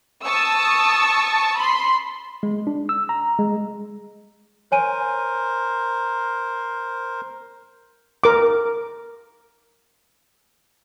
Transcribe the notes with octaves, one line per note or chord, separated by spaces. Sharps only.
A5 C#6 D#6 E6
B5 C6
G#3
D4
E6
A#5
G#3
A#4 C5 C#5 G#5 D#7
A#4 D6